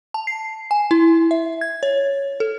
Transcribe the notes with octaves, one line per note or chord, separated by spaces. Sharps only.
A5
C7
G#5
E4
E5
G#6
C#5
A4